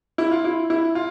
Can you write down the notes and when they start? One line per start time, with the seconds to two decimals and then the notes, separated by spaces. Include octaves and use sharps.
0.18 E4
0.32 F4
0.44 E4
0.70 E4
0.95 F4